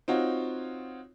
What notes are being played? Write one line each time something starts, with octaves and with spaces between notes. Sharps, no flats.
C4 D#4 F4 F#4 C#5